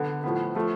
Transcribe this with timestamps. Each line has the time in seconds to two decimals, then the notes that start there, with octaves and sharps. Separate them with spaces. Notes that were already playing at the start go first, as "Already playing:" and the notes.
Already playing: D3 B3
0.24 A2 F3 B3
0.55 F3 A3